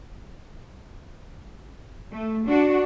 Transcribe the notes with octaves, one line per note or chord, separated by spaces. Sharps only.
A3
D4 F#4